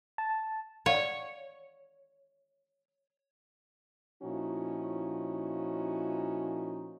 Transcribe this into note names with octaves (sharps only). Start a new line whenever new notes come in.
A5
C#5 D5 F5 F#5
A#2 F3 C#4 D#4 E4 F#4